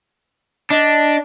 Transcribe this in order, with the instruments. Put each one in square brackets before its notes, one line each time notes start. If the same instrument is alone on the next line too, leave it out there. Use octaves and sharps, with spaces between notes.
[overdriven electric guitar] D4 [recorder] D#5